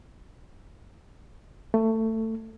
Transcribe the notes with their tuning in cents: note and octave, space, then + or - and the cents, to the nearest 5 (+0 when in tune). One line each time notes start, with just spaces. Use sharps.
A3 +20